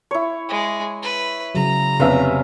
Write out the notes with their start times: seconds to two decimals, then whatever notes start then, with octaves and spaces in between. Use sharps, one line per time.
0.11 E4 C#5
0.49 G#3
1.02 B4
1.55 C#3 F#3 A#5
2.00 F1 C3 B3 C#4 E5 F5